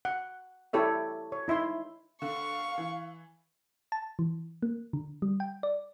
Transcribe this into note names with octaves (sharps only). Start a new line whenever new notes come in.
F#5
E4 G4 A4 C#5 E5
C#5
D#4 E4 E5 C6
D3 F5 C#6
E3
A5
E3
A#3
D3
G3
G5
D5